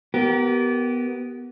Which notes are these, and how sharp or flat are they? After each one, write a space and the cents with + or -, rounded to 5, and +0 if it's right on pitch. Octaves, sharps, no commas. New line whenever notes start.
B3 +0 G4 -25 A#4 +0